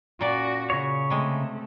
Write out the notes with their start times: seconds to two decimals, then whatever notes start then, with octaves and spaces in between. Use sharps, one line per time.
0.21 A#2 C#4 F#4 D5
0.70 C#3 C#5
1.10 C3 G#3 A3